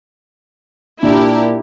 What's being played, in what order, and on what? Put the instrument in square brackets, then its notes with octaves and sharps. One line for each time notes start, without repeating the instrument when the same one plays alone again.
[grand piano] A#2 [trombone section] D4 [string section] E4 G4 A#4